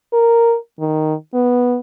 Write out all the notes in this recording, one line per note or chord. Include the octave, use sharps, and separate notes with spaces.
A#4
D#3
B3